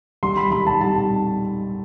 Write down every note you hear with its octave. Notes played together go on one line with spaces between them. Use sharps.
G3 C6
B5
G3 B5
A5
G3 A5